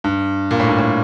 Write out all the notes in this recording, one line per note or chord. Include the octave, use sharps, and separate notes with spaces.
G2
A#2
A2
G2
A2